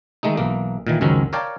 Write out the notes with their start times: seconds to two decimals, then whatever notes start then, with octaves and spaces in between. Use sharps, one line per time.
0.23 D#3 G#3 A3 D#4
0.37 B1 E3 A#3
0.87 A#2 D#3 E3
1.01 C#2 F#2 D#3 F#3 C4 C#4
1.33 A#4 C#5 D5 F5 G5 A5